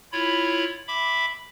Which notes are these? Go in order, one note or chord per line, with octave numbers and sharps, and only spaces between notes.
E4 F4 C#5 B5
E5 B5 D6